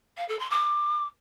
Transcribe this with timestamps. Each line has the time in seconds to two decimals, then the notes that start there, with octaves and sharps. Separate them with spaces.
0.17 F5
0.28 A4
0.39 C6
0.50 D6